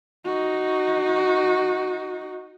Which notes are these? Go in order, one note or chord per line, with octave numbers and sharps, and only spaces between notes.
D#4 F#4